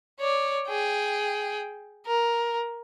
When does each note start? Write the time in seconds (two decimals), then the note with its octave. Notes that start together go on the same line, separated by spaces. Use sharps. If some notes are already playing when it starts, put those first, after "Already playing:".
0.20 C#5 D5
0.68 G#4 G5
2.07 A#4